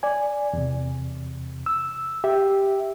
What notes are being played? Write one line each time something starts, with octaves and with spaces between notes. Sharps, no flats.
D5 G#5
E2 C3
E6
G4 E5